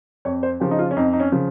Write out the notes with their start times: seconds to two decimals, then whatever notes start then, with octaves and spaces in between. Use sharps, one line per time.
0.25 F2 C#5
0.43 C5
0.60 C#3 F3 G4
0.71 D#4
0.79 F4
0.91 C#4
0.96 F2 D#4
1.13 D#4
1.20 C#4
1.32 C#3 F3